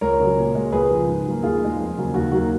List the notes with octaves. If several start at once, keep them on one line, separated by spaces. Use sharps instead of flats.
C#2 A#4 C#5
C#3 F#3
A#2
G#3
C#2 G#4 B4
C#3 F3
G#2
F#3 A#3
D#2 F4 G#4
D#3 G#3
F2
C#3 F#3 A#3
D#2 F#4
D#3 F#3 A#3 F#4